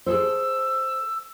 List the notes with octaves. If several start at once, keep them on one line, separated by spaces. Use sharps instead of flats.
G#4 A4 C5 E6